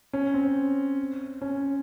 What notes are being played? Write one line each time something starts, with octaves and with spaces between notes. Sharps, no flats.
C#4
C4
C#4